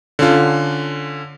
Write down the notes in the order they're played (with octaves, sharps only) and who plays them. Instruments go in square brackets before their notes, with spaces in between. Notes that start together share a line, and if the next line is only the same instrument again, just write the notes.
[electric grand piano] D3 C#4 F4